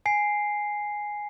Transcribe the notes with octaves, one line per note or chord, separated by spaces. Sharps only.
G#5 C7